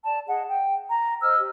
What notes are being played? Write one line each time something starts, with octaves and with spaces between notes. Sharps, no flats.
D5 A5
G#4 D#5 F#5
G5
A#5
C5 D#5 E6 F6
G4